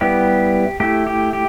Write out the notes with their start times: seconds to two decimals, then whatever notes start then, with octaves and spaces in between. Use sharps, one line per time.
0.01 G3 B3 E4 G4
0.80 A3 E4 G4
1.07 G4
1.33 G4